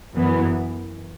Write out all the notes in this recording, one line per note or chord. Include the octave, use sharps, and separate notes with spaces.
F#2 E3 B3